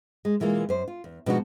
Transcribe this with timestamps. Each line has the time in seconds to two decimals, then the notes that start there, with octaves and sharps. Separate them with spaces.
0.25 G#3
0.40 B2 E3 G#3 A#3 F4
0.69 F#2 C5
0.88 F4
1.04 E2
1.26 B2 F3 G#3 D4 D#4 F#4